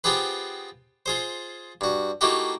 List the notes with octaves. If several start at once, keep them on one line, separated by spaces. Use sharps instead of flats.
B3 C4 F4 G4 G#4 B4
F4 G#4 C5
G2 F#4
A3 A#3 D#4 E4 F#4 G4